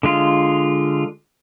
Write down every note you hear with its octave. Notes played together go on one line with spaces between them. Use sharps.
D3 G#3 F4